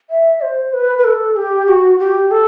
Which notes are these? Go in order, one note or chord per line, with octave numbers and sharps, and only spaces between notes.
E5
C5
B4
B4
A4
G4
F#4
G4
A4